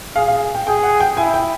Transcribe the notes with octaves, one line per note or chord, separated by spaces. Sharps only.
G#4 F5
F5
G5
G#4 G5
F#5
G5
E4 G#5
G5